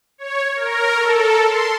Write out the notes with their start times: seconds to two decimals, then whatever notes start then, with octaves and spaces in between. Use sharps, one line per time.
0.18 C#5
0.56 A#4
0.97 A4
1.47 C6